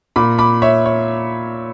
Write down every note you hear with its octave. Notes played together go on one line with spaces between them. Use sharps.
A#2 B5 D6
B5 D6
C#5 E5
C#5